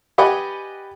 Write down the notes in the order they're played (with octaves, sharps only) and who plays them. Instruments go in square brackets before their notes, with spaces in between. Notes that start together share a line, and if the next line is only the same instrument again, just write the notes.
[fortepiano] G4 B4 D5 D#5 F#5 G#5